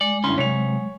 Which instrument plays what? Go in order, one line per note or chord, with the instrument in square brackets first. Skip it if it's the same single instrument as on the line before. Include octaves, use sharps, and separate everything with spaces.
[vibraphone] G#3 [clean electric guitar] D5
[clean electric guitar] D2 C#4 [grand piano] G2 E4 C6
[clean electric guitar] C3 [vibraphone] F#3 G#3 [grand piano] C#5 F7